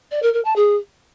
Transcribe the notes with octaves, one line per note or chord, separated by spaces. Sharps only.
D5
A#4
A#4
A5
G#4